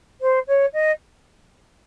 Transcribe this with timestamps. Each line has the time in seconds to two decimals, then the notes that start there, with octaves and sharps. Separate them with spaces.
0.21 C5
0.47 C#5
0.73 D#5